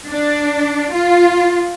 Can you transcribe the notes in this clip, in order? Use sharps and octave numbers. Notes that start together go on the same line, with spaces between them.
D4
F4